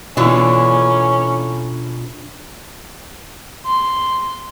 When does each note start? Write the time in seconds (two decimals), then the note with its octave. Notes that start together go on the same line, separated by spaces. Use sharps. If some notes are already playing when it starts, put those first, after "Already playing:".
0.17 B2 D3 E3 C#4 D4 F4
3.66 C6